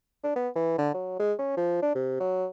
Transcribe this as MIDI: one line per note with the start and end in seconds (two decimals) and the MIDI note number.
0.24 0.34 62
0.36 0.49 59
0.56 0.78 52
0.78 0.90 50
0.94 1.18 54
1.20 1.34 56
1.39 1.53 61
1.57 1.81 53
1.82 1.93 62
1.95 2.20 48
2.20 2.47 54